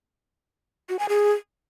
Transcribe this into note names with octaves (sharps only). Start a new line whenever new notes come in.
F#4
G#5
G#4